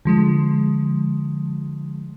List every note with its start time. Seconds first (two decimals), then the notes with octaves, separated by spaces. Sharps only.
0.05 D3 F3 G#3